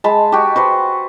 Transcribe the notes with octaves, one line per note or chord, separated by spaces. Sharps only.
G#3 A5 B5
F#4 G4
F#4 B4 C5